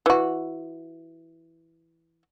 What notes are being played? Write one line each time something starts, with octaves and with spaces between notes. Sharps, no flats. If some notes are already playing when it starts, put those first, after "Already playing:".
E3 F#4